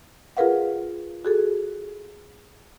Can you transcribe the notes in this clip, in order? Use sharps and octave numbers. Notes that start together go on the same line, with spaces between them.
F4 G#4 A#4 B4 F5 F#5
F#4 G#4 A4